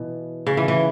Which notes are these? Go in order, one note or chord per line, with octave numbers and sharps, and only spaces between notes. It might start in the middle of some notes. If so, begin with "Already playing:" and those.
Already playing: B2 E3
C#3
E3
E3